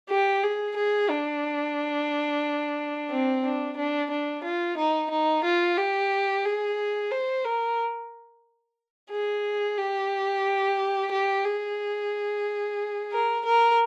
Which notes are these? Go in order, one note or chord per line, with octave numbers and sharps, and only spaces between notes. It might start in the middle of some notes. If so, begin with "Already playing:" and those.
G4
G#4
G#4
D4
C4
D4
D4
D4
F4
D#4
D#4
F4
G4
G#4
C5
A#4
G#4
G4
G4
G#4
A#4
A#4